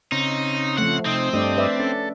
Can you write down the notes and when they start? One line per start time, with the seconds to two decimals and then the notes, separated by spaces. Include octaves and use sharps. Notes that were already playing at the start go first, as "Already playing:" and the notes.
0.12 C#3 C4 D#4
0.78 F3 A3 F#5
1.06 C3 C4 D#4
1.33 G2 A3 D4 D5 D#5
1.57 B4 D5 E5
1.80 C#4 A4